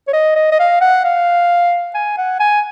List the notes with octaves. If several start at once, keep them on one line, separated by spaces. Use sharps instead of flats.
C#5
D#5
D#5
D#5
F5
F#5
F5
G#5
F#5
G#5